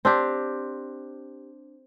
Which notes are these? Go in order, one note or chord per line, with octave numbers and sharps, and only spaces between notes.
C4 D4 G4